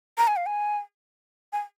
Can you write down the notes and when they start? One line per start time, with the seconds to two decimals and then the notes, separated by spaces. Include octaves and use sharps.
0.18 A#5
0.27 G#5
0.37 F5
0.46 G#5
1.53 G#5